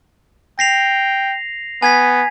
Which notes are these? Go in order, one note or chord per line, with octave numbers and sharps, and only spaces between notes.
G5 A#6 C7 F7
B3 G#5 G#6 B6